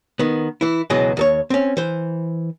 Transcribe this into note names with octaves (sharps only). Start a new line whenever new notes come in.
D#3 B3
E3 E4
C#2 B2 E3 F#3 G#3
D#2 A4 C#5
C4 C#4
E3 C5